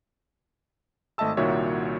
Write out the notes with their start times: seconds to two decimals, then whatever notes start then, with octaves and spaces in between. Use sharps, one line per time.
1.18 G#1 A3 D#5 E5 A5 E6
1.37 C2 A#2 D#3 F#4 C#5 E5